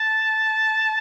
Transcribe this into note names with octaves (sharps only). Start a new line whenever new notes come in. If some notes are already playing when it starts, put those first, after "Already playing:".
Already playing: A5